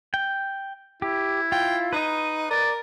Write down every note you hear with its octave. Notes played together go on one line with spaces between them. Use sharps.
G5
E4 G4
F4 G5
D#4 B4 D#5
A#4 D5